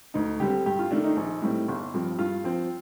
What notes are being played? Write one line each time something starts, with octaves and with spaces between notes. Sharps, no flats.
D2 D#4
D3 G3 C4 G4
G2 G4
F4
D#3 A3 D4
D#4
A#1
A2 G3 C4
G1
G2 F3 C4
G2 F4
F3 C4